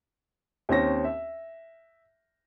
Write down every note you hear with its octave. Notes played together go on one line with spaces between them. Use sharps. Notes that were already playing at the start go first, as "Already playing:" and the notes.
D#2 C4 C#4 A#6
E5